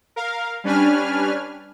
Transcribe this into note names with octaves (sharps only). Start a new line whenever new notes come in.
A#4 F5
G3 C#4 D4 B4 G#5 F6